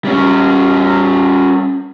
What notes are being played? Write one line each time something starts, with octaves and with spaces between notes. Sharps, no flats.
G3 C#4